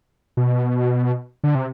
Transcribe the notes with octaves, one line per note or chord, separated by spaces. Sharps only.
B2
D3
C3